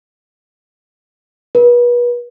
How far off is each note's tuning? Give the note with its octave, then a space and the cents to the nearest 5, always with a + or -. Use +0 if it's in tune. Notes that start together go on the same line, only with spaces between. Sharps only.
B4 -35